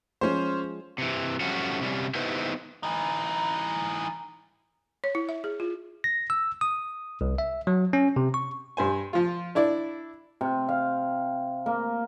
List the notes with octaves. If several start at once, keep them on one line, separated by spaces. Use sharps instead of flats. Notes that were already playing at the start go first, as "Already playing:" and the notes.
F3 G#3 C#4 C5
C3 E3
F3 G3 A3 C#4 F#4
C3 G3 C#4
B3 D#4 E4 G4 B4 C5
E3 D#4
C#5
E4
E5
G#4
F4
A#6
E6
D#6
C2
E5
F#3
C#4
C3
C#6
G2 C5 G#5
F3 F4
D4 E4 D5
C3
F5
A#3